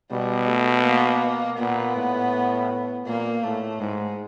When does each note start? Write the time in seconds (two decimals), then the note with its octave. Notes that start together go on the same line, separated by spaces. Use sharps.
0.11 B2 G3
0.48 A3
0.84 A#3
1.58 A#2 B3
1.96 A2
3.06 A#2 A#3
3.44 A2 A3
3.80 G#2 G#3